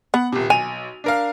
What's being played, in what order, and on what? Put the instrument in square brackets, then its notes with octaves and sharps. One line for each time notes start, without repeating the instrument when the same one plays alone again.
[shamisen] B3 [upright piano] F#5
[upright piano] D#1 C3
[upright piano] B1 D#7 F7 [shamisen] G#5
[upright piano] D4 A#4 F5